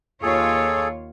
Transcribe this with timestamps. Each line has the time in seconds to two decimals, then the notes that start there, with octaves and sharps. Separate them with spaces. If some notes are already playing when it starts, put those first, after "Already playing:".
0.22 D#2 F4 G#4 A4 C#5